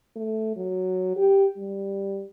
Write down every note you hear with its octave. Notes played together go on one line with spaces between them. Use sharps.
A3
F#3
G4
G3